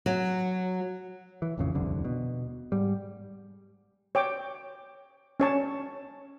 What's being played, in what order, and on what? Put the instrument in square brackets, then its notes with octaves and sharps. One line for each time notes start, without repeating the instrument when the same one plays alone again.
[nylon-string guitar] F#3
[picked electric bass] E3
A1 F2 C#3
D#1 C2 F2 D3
B2
G#2 G3
[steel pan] C#5 G5 D6
C#4 C#5 A5